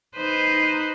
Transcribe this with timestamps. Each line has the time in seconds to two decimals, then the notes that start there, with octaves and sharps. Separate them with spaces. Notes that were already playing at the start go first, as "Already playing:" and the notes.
0.17 D#4 B4 C5